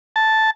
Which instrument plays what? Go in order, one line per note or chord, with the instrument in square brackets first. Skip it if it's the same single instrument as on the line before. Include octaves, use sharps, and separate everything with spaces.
[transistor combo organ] A5